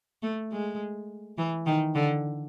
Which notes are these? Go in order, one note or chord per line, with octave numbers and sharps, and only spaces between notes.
A3
G#3
E3
D#3
D3